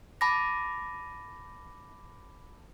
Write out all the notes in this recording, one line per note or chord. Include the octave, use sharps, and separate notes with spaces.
A5 B5 D6 A#6